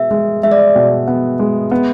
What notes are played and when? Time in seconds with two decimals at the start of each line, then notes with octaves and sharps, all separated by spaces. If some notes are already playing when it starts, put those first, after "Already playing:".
Already playing: B2 G#3 B3 E5
0.11 G#3
0.43 G#3 E5
0.52 D5
0.59 E5
0.75 B2
1.08 B3
1.39 G#3
1.71 B3